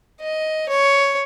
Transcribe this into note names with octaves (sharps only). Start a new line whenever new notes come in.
D#5
C#5